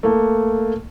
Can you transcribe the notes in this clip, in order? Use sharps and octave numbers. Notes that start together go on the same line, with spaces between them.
A3 A#3